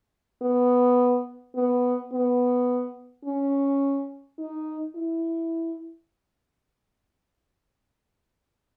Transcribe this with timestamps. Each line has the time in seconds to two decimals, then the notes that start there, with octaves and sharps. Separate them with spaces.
0.42 B3
1.55 B3
2.12 B3
3.25 C#4
4.38 D#4
4.95 E4